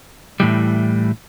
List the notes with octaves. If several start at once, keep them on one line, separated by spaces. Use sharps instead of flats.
A2 E3 G3